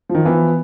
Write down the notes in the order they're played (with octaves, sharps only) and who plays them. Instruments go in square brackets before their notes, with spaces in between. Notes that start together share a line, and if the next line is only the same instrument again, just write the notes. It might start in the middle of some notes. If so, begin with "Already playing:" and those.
[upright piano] F3
[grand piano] D#3
[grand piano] E3 [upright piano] B3